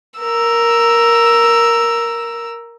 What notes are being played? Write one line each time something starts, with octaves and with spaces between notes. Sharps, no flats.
A#4 E6